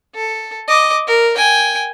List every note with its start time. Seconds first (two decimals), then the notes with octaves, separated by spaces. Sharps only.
0.15 A4
0.68 D#5 D6
1.07 A#4
1.36 G5 G#5